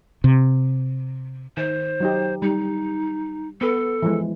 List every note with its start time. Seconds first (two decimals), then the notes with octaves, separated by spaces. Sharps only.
0.24 C3
1.57 D#3 C5
2.00 F#3 D#4 G4
2.42 G3 D#4
3.61 B3 A4 B4
4.02 E3 F3 G#3